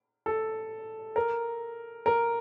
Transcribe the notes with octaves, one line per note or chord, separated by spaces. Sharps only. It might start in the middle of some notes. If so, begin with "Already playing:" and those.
A4
A#4
A#4